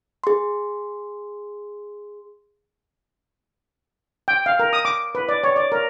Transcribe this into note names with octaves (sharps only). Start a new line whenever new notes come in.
G#4 C6
G5
F5
A#4
D#6
D6
B4
D5
C#5
D5
A#4